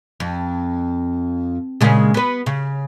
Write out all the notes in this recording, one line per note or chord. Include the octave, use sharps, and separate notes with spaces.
F2
A#2 C#3 G#3
B3 B4
C#3